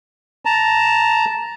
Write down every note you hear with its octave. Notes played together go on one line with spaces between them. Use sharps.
A5 A#5